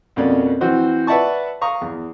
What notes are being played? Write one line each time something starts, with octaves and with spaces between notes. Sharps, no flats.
F2 B2 A#3 C#4 D5
E3 C4 F#4 C5
B4 D5 E5 F#5 A5 C#6
F5 A#5 C#6 D#6
E2